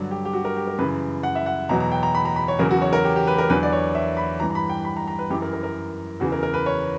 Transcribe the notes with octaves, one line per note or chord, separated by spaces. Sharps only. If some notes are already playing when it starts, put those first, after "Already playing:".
Already playing: G2 D3 F#3
G4
G4
F#4
A#4
G4
A#4
F#2 C#3 E3 B4
F#5
E5
F#5
E2 B2 F#3 A#5
A#5
G5
A#5
B5
A#5
B5
C#5
E2 C#3 F#3 A#4
F#4
C#5
A#4
G4
G4
B4
A#4
E2 D3 F#3 B4
D5
C#5
E5
B5
G2 E3 A#5
A#5
B5
G5
B5
A#5
A#5
B4
F#2 E3 G4
A#4
A#4
A#4
E2 C#3 E3 F#4
A#4
A#4
B4
C#5